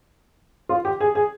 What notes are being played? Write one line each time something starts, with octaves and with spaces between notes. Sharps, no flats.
F4
G4
G#4
G#4